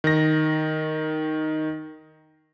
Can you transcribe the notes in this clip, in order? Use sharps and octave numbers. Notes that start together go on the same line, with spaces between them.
D#3 A#6